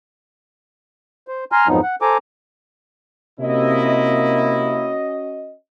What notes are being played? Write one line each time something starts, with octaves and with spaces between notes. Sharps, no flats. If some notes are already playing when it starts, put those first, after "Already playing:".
C5
G#5 A#5 C6 F6
F2 G#2 F3 F#3 B3 D#4
F#5
A4 C5 G#5 A#5 D6
C3 A#3 C#4 E4 F#4 D#5